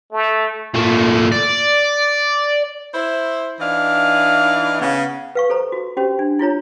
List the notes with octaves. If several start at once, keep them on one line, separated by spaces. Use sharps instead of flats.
A3
A#2 A3
D5
E4 C5
E3 D4 D#4 F5
C#3 B3
B4 F5 C#6
A4 C5 A#5
F#4
C#4 F#4 G4 C5
D4
E4 F4 C#5 A#5